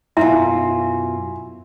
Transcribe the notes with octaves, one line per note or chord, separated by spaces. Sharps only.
F#2 B2 E4 F4 E5 G#5 A#5 C6